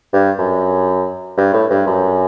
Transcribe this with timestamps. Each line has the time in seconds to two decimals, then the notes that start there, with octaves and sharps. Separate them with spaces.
0.13 G2
0.39 F#2
1.37 G2
1.53 A2
1.70 G2
1.87 F#2